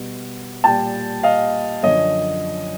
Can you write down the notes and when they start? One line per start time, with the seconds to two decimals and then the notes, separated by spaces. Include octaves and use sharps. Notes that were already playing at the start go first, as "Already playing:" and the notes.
Already playing: B2 G3
0.64 A#2 G3 G5 A5
1.23 D#5 F5
1.83 F#2 D3 F3 C#5 D#5